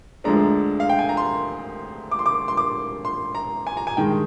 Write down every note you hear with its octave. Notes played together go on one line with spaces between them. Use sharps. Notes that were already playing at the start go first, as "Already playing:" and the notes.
D2 D3 F3 G#3 D4 A#5
F5
G5
G#5
A#5
C6
D6
C6
D6
C6
D6
C6
A#5
G#5
A#5
G#5
G2 D#3 G#3 G5